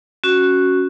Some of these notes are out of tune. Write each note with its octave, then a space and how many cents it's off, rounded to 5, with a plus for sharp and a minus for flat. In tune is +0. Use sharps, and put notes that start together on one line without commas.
C#4 +0 F#4 +0